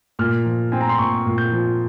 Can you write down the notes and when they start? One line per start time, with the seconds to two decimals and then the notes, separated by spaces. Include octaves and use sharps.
0.19 A#2 F6
0.45 F3
0.72 C4 G#5
0.81 A#5
0.89 C6
0.98 A#2 C#6
1.26 A#2
1.38 G6
1.52 F3